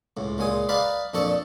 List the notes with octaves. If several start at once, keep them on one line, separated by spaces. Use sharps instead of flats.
C#2 A2
C#2 A#2 G#3 G#5 D#6
B4 D5 D#5 F5 A#5 B5
F2 A#2 D4 A4 D#5 C#6